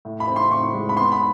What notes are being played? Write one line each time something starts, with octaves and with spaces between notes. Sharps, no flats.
A2
B5
C4
C6
A2 C#6
G#3
B5
B3 C6
B5